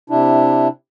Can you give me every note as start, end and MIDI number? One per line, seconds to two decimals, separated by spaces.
0.10 0.68 48
0.10 0.68 62
0.10 0.68 64